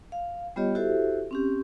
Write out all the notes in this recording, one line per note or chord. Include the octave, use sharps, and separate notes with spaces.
F5
G3 B3 F4 G4 C#5 D#5
E4 F#4 G4 A4 C5 E5
C4 C#4 G4